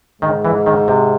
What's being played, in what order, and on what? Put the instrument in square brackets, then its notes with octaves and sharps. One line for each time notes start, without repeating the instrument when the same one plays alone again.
[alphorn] G#2 [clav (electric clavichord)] D#3
[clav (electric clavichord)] E3
D#3
C3